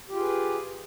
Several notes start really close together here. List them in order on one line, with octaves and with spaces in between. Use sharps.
G4 F4 G#4 B4